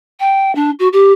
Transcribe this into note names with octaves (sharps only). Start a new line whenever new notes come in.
G5
D4
F#4
G4